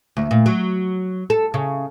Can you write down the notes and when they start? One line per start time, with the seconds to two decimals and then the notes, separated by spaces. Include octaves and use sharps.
0.17 D2
0.31 A#2
0.46 F#3
1.30 A4
1.54 C#3